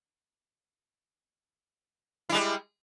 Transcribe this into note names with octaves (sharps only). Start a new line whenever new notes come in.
G3 G#3 E4